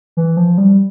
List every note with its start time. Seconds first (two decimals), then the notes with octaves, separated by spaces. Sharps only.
0.17 E3
0.37 F3
0.58 G3